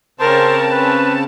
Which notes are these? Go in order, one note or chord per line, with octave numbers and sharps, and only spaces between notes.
C#3 C4 C#4 A#4 C5 A5
C#4 B4